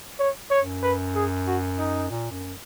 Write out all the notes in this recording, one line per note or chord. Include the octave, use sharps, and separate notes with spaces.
C#5
C#5
F#2
B4
G#4
F#4
D#4
A#2
F#2